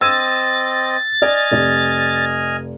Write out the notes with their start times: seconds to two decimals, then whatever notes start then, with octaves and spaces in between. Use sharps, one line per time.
0.01 C4 D#5 E6 G#6 A6 D#7
1.22 D5 D#5 G#5 F6
1.51 F1 D5